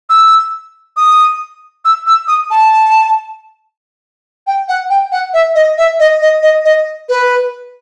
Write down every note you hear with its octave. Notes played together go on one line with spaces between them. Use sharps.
E6
D#6
E6
E6
D#6
A5
G5
F#5
G5
F#5
E5
D#5
E5
D#5
D#5
D#5
D#5
B4